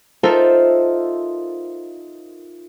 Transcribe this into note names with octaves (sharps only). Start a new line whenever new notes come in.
D#4 F4 A4 A#4 C5 E5